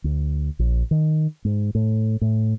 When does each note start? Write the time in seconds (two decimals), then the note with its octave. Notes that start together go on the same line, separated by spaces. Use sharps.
0.04 D2
0.59 A#1
0.91 D#3
1.45 G#2
1.75 A2
2.21 A2